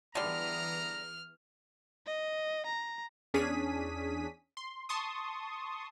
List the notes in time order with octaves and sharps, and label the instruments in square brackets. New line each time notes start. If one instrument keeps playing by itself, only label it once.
[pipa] D3 G3 [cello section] E3 B3 G#4 [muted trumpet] A#5 [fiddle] F6
[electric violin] D#5
A#5
[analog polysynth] E2 C#4 D4 G#4 B6 D#7
C6
A5 C6 C#6 D#6